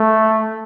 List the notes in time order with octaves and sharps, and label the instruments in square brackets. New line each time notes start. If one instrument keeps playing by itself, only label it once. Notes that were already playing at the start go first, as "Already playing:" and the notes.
Already playing: [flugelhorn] A3